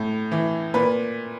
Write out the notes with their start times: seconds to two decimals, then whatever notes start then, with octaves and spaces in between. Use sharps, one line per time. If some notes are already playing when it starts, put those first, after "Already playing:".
Already playing: A2
0.31 E3
0.74 A#2 B4